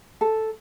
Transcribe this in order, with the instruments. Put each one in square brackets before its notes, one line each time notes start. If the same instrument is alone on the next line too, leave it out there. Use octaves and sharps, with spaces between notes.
[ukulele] A4